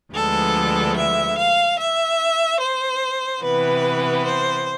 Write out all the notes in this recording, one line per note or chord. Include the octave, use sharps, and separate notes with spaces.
D2 D3 F3 G#3 B3 A4
E5
F5
E5
C5
C3 E3 B3 B4
C5